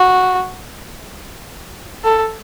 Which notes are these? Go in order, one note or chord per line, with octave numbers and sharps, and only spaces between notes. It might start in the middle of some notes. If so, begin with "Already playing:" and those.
Already playing: F#4
A4